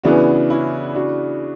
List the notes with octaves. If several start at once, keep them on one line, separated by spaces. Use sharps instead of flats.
C#3 E3 B3 D4 F#4
C#4 E4
D4 F#4